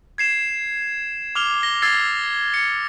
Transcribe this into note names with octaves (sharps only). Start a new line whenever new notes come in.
G#6 C7 E7
D6 F6 F7 G7
A#6 G7
E6 G#6 A6 C7
C#7